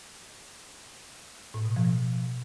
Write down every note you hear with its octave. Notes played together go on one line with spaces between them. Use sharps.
A2
B2
F3